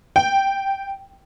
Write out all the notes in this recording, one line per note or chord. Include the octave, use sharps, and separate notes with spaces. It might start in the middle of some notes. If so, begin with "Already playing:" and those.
G5